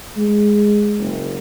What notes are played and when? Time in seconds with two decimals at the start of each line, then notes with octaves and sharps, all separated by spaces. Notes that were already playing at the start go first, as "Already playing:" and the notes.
0.17 G#3
0.99 F#1